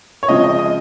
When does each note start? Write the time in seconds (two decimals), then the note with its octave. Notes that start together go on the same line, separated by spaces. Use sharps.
0.23 C#5
0.28 C#3 F3 G#3 C4 D#5
0.44 D#5
0.59 D#5